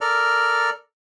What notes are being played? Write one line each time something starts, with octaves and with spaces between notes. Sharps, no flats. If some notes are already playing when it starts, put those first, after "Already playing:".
A4 A#4 D5 F6